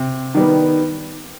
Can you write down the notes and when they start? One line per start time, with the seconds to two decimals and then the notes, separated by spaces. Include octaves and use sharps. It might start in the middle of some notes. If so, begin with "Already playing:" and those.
Already playing: C3
0.34 D#3 G3 B3